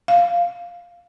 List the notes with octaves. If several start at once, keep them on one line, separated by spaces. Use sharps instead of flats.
F5